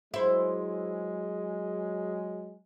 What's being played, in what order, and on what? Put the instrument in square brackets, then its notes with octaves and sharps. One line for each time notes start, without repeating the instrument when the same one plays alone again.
[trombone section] F#3 G#3 [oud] E4 C5